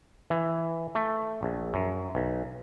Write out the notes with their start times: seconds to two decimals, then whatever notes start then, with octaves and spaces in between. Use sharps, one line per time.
0.30 E3
0.95 A3
1.43 A#1
1.74 F#2
2.15 B1